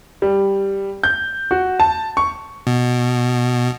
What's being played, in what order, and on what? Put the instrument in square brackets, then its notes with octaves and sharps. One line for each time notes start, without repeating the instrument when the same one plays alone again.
[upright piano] G3
G6
F#4
A5
C#6
[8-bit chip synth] B2